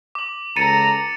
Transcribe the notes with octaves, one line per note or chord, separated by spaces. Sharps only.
D6 F#7
C#2 A4 A#5 A6 C#7 D#7